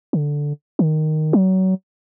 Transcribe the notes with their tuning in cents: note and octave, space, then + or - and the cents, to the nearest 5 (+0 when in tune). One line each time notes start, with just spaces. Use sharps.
D3 -5
D#3 -5
F#3 +25